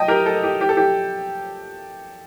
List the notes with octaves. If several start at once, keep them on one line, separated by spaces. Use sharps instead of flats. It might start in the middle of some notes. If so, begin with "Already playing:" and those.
Already playing: D#5 G5 A5
G4 A#4
A4
G4
G4
A4
G4